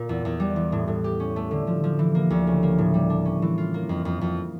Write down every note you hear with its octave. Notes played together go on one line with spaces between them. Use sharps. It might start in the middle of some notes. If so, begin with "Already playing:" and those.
Already playing: A#2
E2
E2
G3
E3
A2
A2
G4
C#4
A3
D3
F3
F3
E3
A#3
D2
C#3
A#3
A2
G3
D4
C#4
E3
F4
A#3
F2
F2
F2